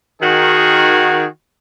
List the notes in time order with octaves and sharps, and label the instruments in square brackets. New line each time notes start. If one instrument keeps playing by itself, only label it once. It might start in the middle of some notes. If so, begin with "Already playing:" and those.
[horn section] D#3 F#4 G#4